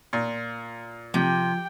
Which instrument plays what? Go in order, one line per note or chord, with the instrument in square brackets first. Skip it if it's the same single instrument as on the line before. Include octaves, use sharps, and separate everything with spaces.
[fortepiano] A#2
[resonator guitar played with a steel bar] C3 [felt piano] F3 [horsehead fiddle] G5